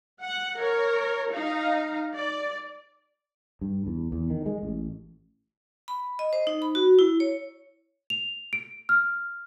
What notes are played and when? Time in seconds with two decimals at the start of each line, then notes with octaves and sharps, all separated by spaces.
0.22 F#5
0.58 A#4 C#5
1.32 D#4 F5 A#5
2.14 D5
3.61 G2
3.87 E2
4.12 E2
4.30 D#3
4.46 G#3
4.63 A1
5.88 B5
6.19 D#5
6.33 C5
6.47 D#4
6.62 B5
6.75 F#4
6.99 E4
7.20 C#5
8.10 F7
8.53 D7
8.89 F6